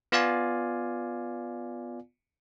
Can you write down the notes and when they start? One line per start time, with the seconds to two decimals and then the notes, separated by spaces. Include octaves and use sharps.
0.12 B3 F4 D5 F5 G#5